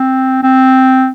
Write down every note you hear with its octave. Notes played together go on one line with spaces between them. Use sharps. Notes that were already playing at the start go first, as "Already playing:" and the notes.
Already playing: C4
C4